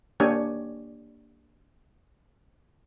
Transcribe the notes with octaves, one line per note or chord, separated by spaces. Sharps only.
A#3 D4 G4 C#5 G#5